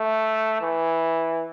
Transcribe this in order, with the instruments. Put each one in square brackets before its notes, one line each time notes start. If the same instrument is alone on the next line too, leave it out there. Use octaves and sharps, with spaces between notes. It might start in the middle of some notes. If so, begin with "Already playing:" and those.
Already playing: [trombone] A3
E3